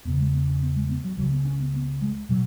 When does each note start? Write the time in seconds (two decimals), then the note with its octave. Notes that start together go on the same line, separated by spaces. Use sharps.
0.05 E2 B3
0.09 C#3
0.20 G#3
0.33 B3
0.48 C#4
0.61 B3
0.76 G#3
0.89 B3
1.04 F#3
1.17 C#2 C#3 F#3
1.31 B3
1.45 C#4
1.60 B3
1.74 B3
2.01 G#3
2.29 B2 F#3